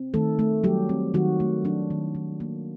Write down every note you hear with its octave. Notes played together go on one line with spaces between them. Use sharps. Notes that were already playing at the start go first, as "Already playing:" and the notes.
Already playing: C4
D#3 A3 A4
A3
F#3 G3 G4
C4
D#3 F#3 F#4
A3
F#3 D4
D#3
D#3
A#3